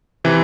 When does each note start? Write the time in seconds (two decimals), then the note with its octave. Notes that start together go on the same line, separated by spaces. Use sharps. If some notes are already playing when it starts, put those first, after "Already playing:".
0.24 C3 E3